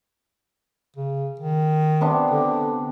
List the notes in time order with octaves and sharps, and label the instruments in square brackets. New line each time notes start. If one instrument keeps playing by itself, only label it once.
[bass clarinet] C#3
D#3
[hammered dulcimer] C3 B3 D4
[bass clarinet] D3